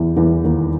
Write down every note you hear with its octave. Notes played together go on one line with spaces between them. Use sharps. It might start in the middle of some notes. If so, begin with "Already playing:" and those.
Already playing: E2 E3
E2 E3
D#2 D#3